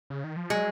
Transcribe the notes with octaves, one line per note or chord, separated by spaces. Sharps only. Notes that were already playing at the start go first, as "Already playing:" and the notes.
C#3
D#3
F3
F#3 G#3